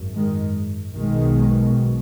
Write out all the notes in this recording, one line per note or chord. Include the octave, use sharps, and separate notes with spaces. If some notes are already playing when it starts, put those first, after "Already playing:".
Already playing: G#1 F#2
D#3 G#3
B1 B2 D#3 G#3